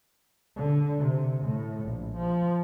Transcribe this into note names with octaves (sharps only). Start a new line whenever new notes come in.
D3
C3
A2
A#1
F3